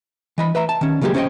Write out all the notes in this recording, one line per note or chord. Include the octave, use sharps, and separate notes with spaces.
E3 D#5 B5
B4 E5 A#5
A5
D#3 C#4
C#3 F#3 A#3 F4 G4 G#4
C#4 C5 D5 D#5 G5